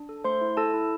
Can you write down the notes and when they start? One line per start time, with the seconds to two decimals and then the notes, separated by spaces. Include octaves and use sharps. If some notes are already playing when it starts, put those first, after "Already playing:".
Already playing: D4
0.09 A4
0.24 A3 C5 C6
0.41 E4
0.57 E4 A4 A5
0.74 E4